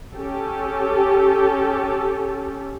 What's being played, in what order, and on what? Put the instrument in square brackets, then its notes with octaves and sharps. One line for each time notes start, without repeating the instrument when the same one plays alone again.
[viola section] C#4 G4 A4